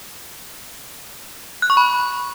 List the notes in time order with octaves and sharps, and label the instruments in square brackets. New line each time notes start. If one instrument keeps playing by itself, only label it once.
[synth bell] F#6
C#6
B5